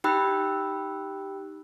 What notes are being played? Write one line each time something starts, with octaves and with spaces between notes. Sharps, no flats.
D#4 G4 G5 B5 E6 F#6